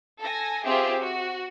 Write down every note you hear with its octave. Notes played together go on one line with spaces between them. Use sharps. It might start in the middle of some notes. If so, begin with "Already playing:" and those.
A4 G#5 A#6
C4 F4 G4 G#4 E5
F#4